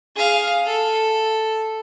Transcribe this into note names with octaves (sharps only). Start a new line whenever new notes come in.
G#4 F5
A4